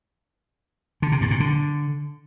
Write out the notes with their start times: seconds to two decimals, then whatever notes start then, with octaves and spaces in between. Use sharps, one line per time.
1.02 D3
1.12 C3
1.21 G2
1.31 A#2
1.40 D3